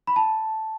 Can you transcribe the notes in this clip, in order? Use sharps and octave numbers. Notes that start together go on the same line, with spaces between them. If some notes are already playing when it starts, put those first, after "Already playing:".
B5
A5